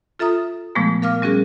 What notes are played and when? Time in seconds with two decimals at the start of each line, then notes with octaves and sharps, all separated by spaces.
0.19 F4 A4 E5 A#5 D#6
0.75 A#2 F3 G#3 A3 B3
1.02 A#4 F5 D6 F6
1.22 G3 C#4 F#4 G#4 A#4